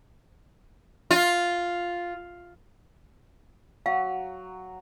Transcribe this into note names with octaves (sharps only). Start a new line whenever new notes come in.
F4
F#3 F5